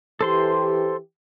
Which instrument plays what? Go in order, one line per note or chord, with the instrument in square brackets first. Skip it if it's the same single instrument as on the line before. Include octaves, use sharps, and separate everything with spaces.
[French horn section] E3 G4 [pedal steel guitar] A4 C5 C6